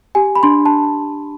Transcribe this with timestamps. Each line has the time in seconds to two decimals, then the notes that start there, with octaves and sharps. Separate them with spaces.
0.15 G4 G#5
0.35 B5
0.43 D4 C6
0.66 A5